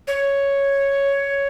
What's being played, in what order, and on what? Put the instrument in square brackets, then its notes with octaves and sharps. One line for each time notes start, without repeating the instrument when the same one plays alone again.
[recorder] C#5